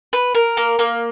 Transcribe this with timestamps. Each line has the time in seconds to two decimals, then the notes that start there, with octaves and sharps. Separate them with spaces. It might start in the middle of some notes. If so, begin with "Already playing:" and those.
0.13 B4
0.35 A#4
0.57 A#3
0.79 A#3